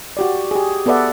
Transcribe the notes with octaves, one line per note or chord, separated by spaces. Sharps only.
F#4 G4 D5
G4 G#4
B3 A4 B4 D5 E5 F#5